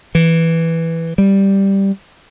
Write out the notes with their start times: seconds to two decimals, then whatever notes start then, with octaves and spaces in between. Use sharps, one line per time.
0.15 E3
1.18 G3